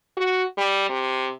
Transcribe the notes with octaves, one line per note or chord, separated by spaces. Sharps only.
F#4
G3
C3